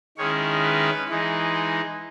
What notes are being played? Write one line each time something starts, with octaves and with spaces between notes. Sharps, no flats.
D#3 G#3 C#4 E4 C#5
B4
E3 G#3 D#4